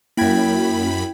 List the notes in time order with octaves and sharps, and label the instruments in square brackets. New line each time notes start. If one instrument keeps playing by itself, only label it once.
[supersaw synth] F#2 B5 [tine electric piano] A#3 [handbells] E4 G5 G#6